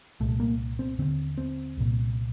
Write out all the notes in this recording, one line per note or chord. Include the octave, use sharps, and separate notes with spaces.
C2 A#2 A3
A#3
C4
D#2 D3 C4
C4
C2 A#2